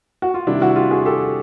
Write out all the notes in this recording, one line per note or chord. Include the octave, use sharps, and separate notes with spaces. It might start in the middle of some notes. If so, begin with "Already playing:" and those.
F#4
F4
C3 D#3 G3 D4 E4
E4 F#4
F4 G4
F#4 G#4
G4 A4